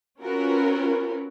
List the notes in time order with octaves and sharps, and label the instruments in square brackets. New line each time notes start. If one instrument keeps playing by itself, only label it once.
[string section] C4 C#4 F4 F#4 A#4 B4